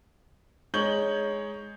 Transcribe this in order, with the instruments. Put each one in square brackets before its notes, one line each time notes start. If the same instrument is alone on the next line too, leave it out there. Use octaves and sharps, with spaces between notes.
[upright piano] G#3 D#4 C#5 G6 F#7 G7